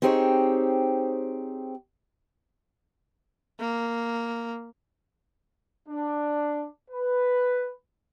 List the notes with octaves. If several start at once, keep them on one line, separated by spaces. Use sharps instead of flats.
C4 D#4 G4 G#4 C5 C#5
A#3
D4
B4